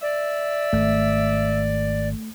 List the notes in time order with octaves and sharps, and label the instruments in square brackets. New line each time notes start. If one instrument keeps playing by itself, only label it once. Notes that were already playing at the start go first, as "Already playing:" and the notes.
[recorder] D5 [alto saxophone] E5
[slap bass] G#1 [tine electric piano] A3